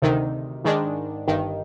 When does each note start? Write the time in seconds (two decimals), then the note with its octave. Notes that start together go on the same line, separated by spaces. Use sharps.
0.02 D2 C3 D#3
0.64 G#2 D#3 G#3 D4
1.27 G1 G2 D#3